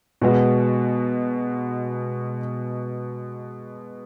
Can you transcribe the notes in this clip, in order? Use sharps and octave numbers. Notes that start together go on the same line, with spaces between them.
B2 G#3 B3 F#4